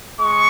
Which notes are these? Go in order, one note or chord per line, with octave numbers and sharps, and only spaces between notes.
G#3 C#6